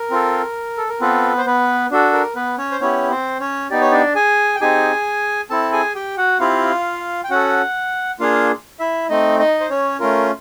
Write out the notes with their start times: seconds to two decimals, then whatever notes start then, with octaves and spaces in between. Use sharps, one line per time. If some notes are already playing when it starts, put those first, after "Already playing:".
Already playing: A#4
0.11 C4 F4 A4
0.77 A4
0.89 A#4
1.00 B3 C4 F4 A4 B4
1.38 C5
1.46 B3 B4
1.91 D4 F#4 A4
2.13 A#4
2.35 B3 B4
2.58 C#4 C#5
2.71 C5
2.80 B3 C#4 E4 G4 C#5
3.10 C4 C5
3.40 C#4 C#5
3.70 B3 D#4 G4 D5
3.81 C#5
3.92 D4 D5
4.15 G#4 G#5
4.55 G5
4.60 C4 D#4 G4 G#4 G#5
5.50 C4 E4 A4 A5
5.73 G#4 G#5
5.95 G4 G5
6.17 F#4 F#5
6.40 C4 E4 F4 G4 F5
7.24 G5
7.30 C#4 F#4 A4 F#5
8.20 A#3 D4 F4 G#4 F5
8.79 E4 E5
9.09 A3 C4 D#4 D#5
9.39 D#4 D#5
9.60 C5
9.70 C#4 C#5
10.00 A3 C#4 F4 A#4